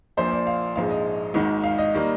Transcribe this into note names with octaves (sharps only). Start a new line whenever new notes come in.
A#1 A#2 F3 C5
D5
F5
A#1 G#2 F3 G#3 F5
D#5
G#1 G#2 D#3
F5
D#5
D#3 G3 A#3